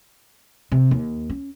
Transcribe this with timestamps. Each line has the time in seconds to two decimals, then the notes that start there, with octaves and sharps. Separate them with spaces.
0.72 C3
0.91 D#2
1.30 C#4